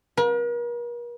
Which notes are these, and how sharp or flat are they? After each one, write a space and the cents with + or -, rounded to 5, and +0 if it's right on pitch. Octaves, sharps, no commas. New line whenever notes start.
A#4 +45